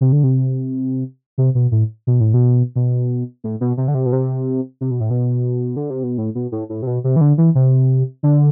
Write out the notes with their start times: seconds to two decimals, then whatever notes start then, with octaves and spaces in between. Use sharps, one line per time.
0.01 C3
0.12 D3
0.23 C3
1.38 C3
1.55 B2
1.72 A2
2.07 B2
2.20 A2
2.34 B2
2.76 B2
3.44 A2
3.61 B2
3.77 C3
3.88 D3
3.94 C3
4.06 B2
4.13 C3
4.81 C3
4.91 B2
5.00 A2
5.10 B2
5.76 D3
5.90 C3
6.03 B2
6.18 A2
6.35 B2
6.52 A2
6.69 A2
6.82 C3
6.87 B2
7.04 C3
7.16 E3
7.21 D3
7.38 E3
7.55 C3
8.23 D3